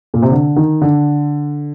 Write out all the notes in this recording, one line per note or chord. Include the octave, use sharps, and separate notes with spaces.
A#2
C3
D3
D#3
D3